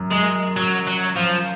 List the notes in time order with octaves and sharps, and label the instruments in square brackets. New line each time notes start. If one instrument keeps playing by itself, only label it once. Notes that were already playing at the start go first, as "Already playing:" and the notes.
Already playing: [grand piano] F#2
[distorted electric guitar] G#3
F#3
F#3
F3